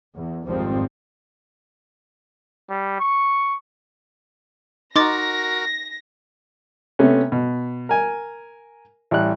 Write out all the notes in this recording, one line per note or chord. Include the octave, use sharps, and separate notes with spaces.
E2
G#1 F2 D#3 F3 G3 C4
G3
C#6
D#4 F#4 A#4 C6 D6 A6 A#6
C3 A3 B3 C#4
B2
A#4 G#5
A1 G3 F#6